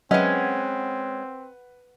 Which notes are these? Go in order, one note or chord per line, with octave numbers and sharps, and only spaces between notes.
F#3 G#3 C4 C#4 B4 D#5 E5 F#5